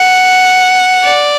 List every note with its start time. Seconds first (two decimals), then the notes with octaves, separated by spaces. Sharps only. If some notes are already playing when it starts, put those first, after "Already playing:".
Already playing: F#5
1.05 D5